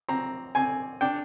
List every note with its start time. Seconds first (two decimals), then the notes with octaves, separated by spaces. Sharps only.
0.09 C4 A#5
0.55 C4 G#5
1.01 D4 G5